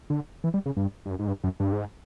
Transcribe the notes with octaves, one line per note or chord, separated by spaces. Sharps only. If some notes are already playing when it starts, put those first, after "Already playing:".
D3
E3
G3
C#3
G2
G2
F#2
G#2
G2
F#2
G2
G#2